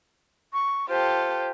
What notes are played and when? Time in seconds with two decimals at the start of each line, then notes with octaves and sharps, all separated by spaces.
0.53 C#6
0.89 F4 G4 A4 C5